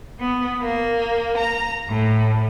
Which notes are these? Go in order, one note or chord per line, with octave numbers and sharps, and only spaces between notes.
B3
A#3
A#5
A2